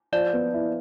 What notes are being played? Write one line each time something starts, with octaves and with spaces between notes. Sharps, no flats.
F3 D5
B3
E4